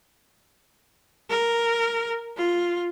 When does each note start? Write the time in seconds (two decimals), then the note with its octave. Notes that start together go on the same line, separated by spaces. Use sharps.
1.30 A#4
2.37 F4